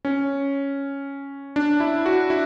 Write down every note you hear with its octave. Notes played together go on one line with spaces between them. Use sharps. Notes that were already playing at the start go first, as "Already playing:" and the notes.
C#4
D4
E4
F#4
E4